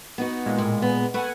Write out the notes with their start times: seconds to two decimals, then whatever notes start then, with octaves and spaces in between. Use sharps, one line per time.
0.18 B3 D#4 F#4
0.46 A#2 G#3
0.58 A2
0.82 B3
1.14 A3 B4 F#5 G#5